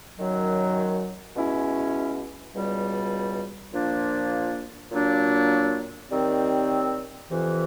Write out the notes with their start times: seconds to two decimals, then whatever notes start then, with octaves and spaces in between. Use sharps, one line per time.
0.17 F#2 D#3 F#3
1.35 B2 G#3 C#4 E4
2.54 C#2 B2 G3
3.72 A#2 F3 A#3 D4
4.92 A#2 F#3 A#3 D4
6.10 D#2 D#3 G3 C4
7.29 F2 C3 E3